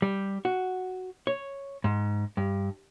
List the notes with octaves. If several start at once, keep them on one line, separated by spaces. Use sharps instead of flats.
G3
F#4
C#5
G#2
G2